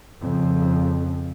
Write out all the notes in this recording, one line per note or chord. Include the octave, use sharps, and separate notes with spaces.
F2 C#3